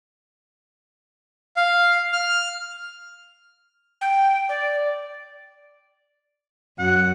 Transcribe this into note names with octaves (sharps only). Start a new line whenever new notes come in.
F5
F6
G5
D5
F#2 F#5